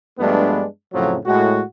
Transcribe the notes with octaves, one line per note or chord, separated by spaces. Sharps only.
G2 F3 G#3 A3 B3 D4
F2 A2 C#3 F3 F#3
A2 G#3 F#4